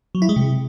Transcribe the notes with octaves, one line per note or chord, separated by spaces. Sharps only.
F#3
E4
G#3
C3